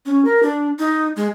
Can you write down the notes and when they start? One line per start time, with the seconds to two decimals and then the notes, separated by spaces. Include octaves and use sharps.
0.06 C#4
0.25 A#4
0.43 D4
0.79 D#4
1.16 G#3